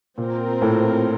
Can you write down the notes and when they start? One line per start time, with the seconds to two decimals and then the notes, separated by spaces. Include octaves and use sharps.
0.18 A#2 C4 F4 A#4
0.62 A2